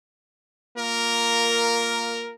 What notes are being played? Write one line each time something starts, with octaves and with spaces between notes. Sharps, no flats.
A#3 F4 A#4